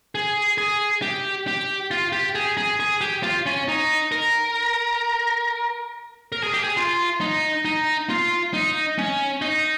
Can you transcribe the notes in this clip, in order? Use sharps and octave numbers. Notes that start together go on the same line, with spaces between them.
G#4
G#4
G4
G4
F4
G4
G#4
G#4
G#4
G4
F4
C#4
D#4
A#4
A#4
G#4
G4
G#4
F4
D#4
D#4
F4
D#4
C#4
D#4